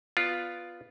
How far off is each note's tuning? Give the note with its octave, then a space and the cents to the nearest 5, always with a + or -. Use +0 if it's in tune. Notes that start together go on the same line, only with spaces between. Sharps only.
B3 +0 F4 +0 D5 +0